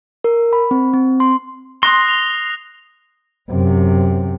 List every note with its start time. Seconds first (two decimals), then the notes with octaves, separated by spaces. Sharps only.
0.24 A#4
0.53 B5
0.71 C4
0.93 C4
1.20 C6
1.83 C6 D#6 F#6 A#6
2.09 F7
3.50 F#2 C3